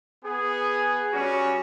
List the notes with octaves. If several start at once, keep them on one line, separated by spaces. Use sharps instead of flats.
B3 G#4
G3 C#4 F#4